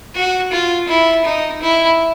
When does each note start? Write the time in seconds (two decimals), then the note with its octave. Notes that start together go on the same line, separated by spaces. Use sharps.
0.15 F#4
0.52 F4
0.88 E4
1.25 D#4
1.62 E4